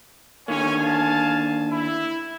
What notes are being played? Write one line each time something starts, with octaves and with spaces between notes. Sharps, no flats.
D3 D#3 A#3 C#4 C#5 G#5
F5 G#5 A5
E4